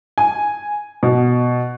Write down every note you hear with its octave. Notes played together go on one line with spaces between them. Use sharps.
G#5
B2